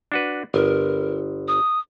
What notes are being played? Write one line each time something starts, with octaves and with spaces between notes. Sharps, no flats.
D4 F#4 B4
G1 A#4
D#6